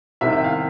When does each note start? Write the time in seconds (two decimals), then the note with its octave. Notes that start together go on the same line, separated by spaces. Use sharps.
0.21 C2 C3 D#3 E5
0.33 E5
0.44 F5